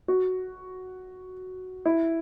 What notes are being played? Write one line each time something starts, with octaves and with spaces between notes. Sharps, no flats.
F#4
E4